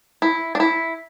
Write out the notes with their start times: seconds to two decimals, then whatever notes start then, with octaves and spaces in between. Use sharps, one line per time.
0.22 E4
0.55 D4
0.60 E4